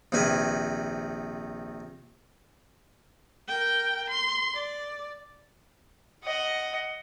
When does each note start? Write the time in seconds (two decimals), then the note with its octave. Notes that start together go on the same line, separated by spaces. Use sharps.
0.12 A#1 C3 D#3 B4 G#5
3.48 A#4 G5
4.10 C6
4.54 D5
6.24 D#5 F#5